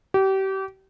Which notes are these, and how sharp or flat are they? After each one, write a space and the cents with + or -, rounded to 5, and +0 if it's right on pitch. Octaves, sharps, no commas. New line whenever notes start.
G4 -30